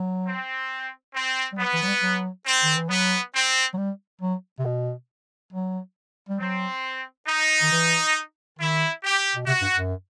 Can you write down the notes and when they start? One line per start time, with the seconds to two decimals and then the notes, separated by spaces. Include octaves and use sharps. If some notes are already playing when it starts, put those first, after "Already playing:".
Already playing: F#3
0.27 C4
1.15 C4
1.52 G3
1.59 F#3 B3
1.73 E3
1.83 F#3
1.87 G3
2.02 F#3
2.46 C4
2.62 D#3
2.76 E3
2.89 F#3 B3
3.34 C4
3.74 F#3
3.77 G3
4.21 F#3
4.59 C3
4.65 B2
5.53 F#3
6.29 G3
6.40 F#3 C4
7.28 D#4
7.62 D#3
7.72 E3
8.59 D#3 E4
9.03 G4
9.35 B2
9.47 C3 F#4
9.61 G2
9.76 F#2